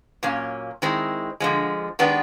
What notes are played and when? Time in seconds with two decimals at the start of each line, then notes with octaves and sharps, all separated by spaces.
0.23 A#2 F#3 A#3 C#4
0.82 D#3 G#3 C4 E4
1.40 D3 F3 G#3
1.99 D#3 G#3 B3 D4 G4